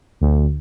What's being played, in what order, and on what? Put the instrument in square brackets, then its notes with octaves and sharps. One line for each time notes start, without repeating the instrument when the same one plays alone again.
[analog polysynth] D2